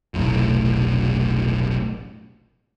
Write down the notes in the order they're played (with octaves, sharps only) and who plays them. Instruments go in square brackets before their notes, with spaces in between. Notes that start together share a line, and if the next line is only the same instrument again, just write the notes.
[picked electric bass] F1 B1 A2